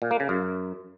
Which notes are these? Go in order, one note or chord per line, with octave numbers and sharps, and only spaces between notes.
A#2
A#3
C#3
F#2